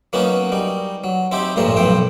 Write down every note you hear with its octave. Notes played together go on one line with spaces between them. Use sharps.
F#3 A#3 B3 C#4 D#4
G3 D#4
F#3
C4 D#4 E4 G4
A1 G2 A#2 F3 A3 A#5
B1 F3 E4 G5